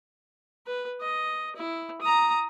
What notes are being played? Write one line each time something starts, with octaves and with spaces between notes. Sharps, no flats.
B4
D#5
E4
A#5 D#6